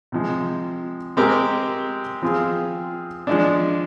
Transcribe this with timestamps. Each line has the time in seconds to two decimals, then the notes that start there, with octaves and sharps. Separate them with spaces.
0.12 C3 F3 G#3
1.17 G#3 C4 G4 A#4
2.22 F3 C4 F4 G#4
3.27 F3 G#3 D4